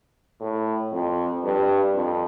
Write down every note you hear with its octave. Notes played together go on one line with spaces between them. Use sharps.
A2
F2
G2
F2